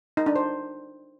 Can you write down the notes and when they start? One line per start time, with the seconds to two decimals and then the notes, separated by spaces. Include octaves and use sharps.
0.17 D#4
0.26 D4
0.36 C5